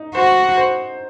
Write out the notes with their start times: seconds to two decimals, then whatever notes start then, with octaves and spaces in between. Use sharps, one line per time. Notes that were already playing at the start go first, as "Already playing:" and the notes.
Already playing: D#4
0.15 F#4 C5
0.57 C5